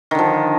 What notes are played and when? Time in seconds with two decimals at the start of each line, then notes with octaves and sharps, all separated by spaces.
0.11 D#3
0.15 D3
0.19 F3